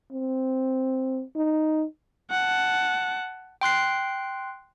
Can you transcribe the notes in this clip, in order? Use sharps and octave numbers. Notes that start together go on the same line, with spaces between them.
C4
D#4
F#5 A5
G5 C6 F#6 C7